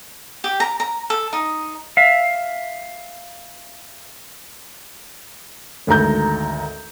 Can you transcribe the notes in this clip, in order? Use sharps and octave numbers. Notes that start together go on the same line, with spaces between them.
G4
A#5
A#5
A4
D#4
E5 F5
G#1 D2 A4 A#5 G6